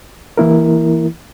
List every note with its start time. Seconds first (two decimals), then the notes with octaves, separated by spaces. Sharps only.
0.37 E3 A#3 E4 A#4